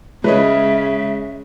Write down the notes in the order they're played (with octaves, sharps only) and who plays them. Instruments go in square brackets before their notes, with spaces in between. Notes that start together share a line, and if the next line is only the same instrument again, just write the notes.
[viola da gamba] C#3 [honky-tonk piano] G#3 [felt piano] B4 C#5 D#5 [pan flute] E5